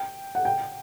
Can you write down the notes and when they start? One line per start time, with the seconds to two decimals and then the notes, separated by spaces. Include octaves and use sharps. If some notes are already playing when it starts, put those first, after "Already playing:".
Already playing: G5
0.35 F#5
0.45 G5